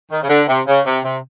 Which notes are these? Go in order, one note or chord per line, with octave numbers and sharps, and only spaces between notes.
D#3
C#3
D3
C3
C#3
C3
C3